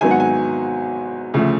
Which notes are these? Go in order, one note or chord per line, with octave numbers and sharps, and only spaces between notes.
G#1 G#2 F#3 B3 G#5
F#5
G#5
D2 C#3 F3 A3